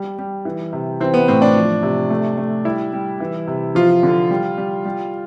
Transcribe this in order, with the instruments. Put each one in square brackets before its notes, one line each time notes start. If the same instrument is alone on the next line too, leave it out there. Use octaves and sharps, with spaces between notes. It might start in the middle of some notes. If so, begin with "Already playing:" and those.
Already playing: [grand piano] G3
G3
E3
C3
E3 C4
B3
A2 C4
D4
F3
C3
A3
A3
G3 E4
G3
E3
C3
F3 F4
D3
G3
G3
G3